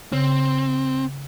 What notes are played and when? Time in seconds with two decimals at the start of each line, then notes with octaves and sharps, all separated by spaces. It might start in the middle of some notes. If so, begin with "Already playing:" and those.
0.12 C#3 C4